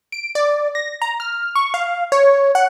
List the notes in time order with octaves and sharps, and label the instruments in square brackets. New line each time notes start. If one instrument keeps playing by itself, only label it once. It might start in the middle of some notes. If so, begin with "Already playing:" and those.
[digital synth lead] D7
D5
A#6
A#5
F6
C#6
F5
C#5
F#5